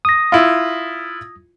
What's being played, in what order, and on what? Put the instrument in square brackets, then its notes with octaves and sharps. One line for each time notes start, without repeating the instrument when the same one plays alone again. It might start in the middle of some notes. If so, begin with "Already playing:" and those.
[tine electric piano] D#6 A#6
[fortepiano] E4 F4